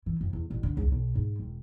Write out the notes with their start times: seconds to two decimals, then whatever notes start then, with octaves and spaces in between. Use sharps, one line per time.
0.06 E3
0.21 F2
0.33 E2
0.50 A1
0.63 D3
0.77 C#2
0.92 B1
1.15 G#2
1.40 E1